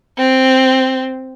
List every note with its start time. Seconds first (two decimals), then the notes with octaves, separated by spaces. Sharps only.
0.18 C4